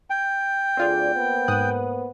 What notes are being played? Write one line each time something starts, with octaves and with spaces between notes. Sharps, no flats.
G5
D2 C4 F4 G#4 D5
A#3 B3 C5
G#2 D#6 F#6